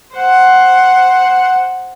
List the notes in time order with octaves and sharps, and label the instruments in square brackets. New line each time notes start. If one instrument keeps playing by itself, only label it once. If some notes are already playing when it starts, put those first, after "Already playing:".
[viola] C5 F#5